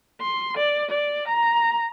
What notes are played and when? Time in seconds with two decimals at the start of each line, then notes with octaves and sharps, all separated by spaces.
0.21 C6
0.57 D5
0.91 D5
1.28 A#5